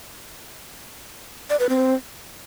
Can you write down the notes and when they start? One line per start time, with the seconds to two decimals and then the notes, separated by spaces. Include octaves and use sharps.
1.50 D5
1.60 B4
1.69 C4